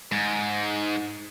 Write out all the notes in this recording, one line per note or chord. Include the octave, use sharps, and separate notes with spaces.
G#2